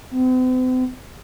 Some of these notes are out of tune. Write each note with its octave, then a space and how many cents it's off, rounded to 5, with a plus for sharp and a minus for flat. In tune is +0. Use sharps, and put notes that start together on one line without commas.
C4 -45